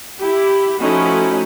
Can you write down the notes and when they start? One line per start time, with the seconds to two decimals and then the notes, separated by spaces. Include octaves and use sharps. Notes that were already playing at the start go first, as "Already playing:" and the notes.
0.19 E4 G4
0.81 F3 A3 C#4 D#4 E4 F#4